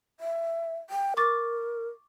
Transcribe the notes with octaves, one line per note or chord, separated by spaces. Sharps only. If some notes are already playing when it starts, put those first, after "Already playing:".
E5
G5
A#4 C#6 D6 A6